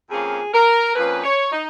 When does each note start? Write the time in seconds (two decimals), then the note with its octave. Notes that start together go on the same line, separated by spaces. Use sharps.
0.10 F2 F3 A#3 C#4 G#4
0.53 A#4
0.95 F2 F3 A#3 C#4 B4
1.24 C#5
1.52 D#4